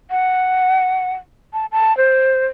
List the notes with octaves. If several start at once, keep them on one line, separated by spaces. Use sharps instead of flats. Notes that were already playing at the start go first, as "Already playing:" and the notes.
F#5
A5
A5
C5